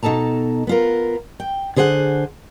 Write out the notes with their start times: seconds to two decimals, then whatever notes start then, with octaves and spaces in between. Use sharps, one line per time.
0.03 B2 D#4 A4 A5 A#5
0.67 B3 F4 A#4
1.40 G5
1.76 D3 G#4 C5 D5 F#5